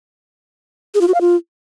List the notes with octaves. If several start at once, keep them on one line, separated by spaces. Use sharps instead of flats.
G#4
F4
F#4
F5
F4